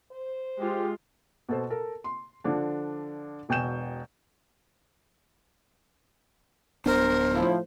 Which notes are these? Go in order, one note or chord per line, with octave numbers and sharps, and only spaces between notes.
C5
G#3 F4 G4
B2 A4 C5
A4 A#4
C6
D3 F3 D4
E1 B2 G5 G#5 G6 E7
D1 B3 D4 A#4 C5
A2 F3 E4